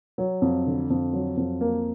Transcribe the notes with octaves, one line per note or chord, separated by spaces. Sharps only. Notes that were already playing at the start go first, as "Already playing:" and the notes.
F#3
F2
D3
F2
F#3
F2
A#3